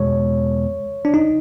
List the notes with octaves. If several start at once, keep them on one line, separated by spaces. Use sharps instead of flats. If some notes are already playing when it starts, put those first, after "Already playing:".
Already playing: E2 B2 G#3 C#5
D4
D#4